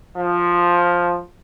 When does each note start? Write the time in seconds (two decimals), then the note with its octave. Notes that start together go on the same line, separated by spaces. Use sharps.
0.17 F3